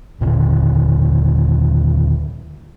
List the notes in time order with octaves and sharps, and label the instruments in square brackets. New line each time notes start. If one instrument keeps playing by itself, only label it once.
[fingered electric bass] D#2 A#2 D3 D#3